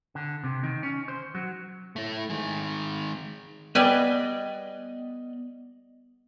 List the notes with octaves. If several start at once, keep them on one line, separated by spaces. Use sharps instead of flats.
D3
C3
D#3
C#4
C5
F#3
A3 E4
D#3 G#3
G3 B3 B4 D5 D#5 G#5